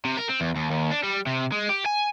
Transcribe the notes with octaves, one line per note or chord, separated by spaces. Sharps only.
C3
A#4
C4
E2
D#2
D#2
D4
G3
C3
G#3
G4
G#5